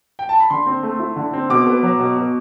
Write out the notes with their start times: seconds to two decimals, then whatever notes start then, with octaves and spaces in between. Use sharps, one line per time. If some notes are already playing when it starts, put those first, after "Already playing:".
0.19 G5
0.29 A5
0.40 B5
0.50 D3 C6
0.66 C4
0.83 A3
1.00 E4
1.16 D3
1.33 C4
1.50 B2 D6
1.66 B3
1.83 F#3
2.00 B2
2.17 B2